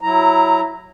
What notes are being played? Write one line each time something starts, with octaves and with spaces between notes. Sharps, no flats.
F#3 E4 A#5